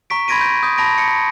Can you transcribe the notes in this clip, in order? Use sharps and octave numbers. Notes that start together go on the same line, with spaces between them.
A#5 C#6 B6 D7
B5 C6 G#6 A#6 D7 D#7
G6 D7
D#6 G6
A5 B5 A#6 D7
C#7